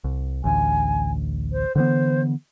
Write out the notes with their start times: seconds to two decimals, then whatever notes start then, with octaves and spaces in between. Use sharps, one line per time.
0.04 C2
0.44 A1 D2 G#5
1.52 C5
1.75 D3 E3 B3 C5